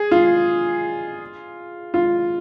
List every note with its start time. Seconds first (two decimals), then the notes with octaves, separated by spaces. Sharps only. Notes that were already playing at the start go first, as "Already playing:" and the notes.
Already playing: G#4
0.11 F4
1.94 F4